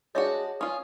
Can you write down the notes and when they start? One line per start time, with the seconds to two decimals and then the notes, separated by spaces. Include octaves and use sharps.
0.15 G#3 D4 F#4 G#4 C#5 D#5 E5
0.61 C#4 F4 D#6